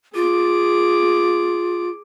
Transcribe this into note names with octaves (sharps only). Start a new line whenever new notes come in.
F4 G#4 D6